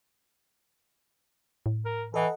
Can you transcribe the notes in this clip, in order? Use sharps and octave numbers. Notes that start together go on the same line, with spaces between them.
A2
A#4
E3 A4 D#5 F#5